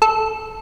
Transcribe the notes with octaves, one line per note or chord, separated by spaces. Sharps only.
A4